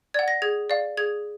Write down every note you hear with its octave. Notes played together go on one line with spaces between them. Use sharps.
D5 F#5 G#6
A#6
G#4 G#6
D5 F5
G#4 G#6